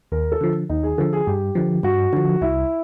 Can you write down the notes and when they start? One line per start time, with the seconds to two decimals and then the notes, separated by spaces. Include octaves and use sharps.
0.12 D#2 A#4
0.32 A4
0.41 D3 F3
0.69 D#2 D#4
0.83 G#4
0.98 D3 F3 A4
1.13 G#4
1.27 G2 G4
1.55 D3 F3
1.83 G2 F#4
2.13 D3 F3
2.41 C2 E4